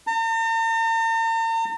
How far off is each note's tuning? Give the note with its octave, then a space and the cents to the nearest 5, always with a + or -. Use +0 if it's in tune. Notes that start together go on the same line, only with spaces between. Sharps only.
A#5 -45